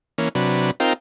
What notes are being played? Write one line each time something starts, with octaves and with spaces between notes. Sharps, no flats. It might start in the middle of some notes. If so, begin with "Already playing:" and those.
E3 A#3 C#4
C3 F#3 D4 B4
C4 D#4 F4 A#4 G5